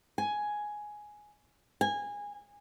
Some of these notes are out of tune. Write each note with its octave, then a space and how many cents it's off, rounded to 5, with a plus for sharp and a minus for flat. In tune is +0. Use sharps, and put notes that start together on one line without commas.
G#5 +5
G#5 -20